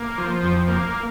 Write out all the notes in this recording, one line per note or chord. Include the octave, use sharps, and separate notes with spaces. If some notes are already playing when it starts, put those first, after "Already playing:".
Already playing: A#3
F3
F2
A#3